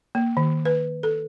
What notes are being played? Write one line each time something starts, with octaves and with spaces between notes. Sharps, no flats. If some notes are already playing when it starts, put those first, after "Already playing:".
A#3
D#3
B4
A4